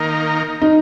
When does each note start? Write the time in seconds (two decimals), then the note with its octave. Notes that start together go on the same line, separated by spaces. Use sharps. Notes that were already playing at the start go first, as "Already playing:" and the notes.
Already playing: D#3 A#3 D#4 A#4
0.61 D#4